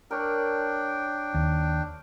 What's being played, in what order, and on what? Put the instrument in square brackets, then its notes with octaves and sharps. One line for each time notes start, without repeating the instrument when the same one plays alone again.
[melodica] D4 G5 [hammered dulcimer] A#4 C#5 D5
[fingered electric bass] D#2